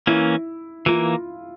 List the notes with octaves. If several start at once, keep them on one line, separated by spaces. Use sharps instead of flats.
E3 A#3 C#4 E4
E3 A#3 F4